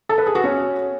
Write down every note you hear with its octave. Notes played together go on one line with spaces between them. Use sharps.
A4
B4
G#4
F#4
C#4